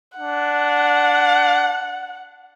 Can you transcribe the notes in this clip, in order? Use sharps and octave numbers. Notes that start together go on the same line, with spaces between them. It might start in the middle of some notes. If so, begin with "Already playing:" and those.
D4 F#5